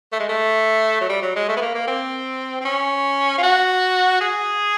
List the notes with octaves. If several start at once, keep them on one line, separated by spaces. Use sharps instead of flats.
A3
G#3
A3
F#3
G3
F#3
G#3
A3
B3
A#3
A#3
C4
C4
C#4
F4
F#4
G#4